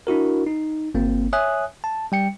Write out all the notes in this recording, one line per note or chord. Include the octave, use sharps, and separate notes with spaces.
D4 E4 F#4 A#4
D#4
G1 A#3 C4
C#5 E5 G#5 D#6 F#6
A5
G3 G5 C#7